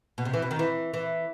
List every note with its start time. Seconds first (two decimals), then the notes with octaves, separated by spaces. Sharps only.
0.18 B2
0.25 C3
0.33 E3
0.42 B2
0.51 D#3
0.59 E3
0.94 E3